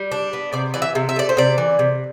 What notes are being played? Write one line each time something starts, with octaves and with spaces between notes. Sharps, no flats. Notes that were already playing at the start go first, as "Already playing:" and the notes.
Already playing: G3
D4
B3
C3 D5
E3 D5
E5
C3
E5
A3 D5
C5
C3 D5
E3
C3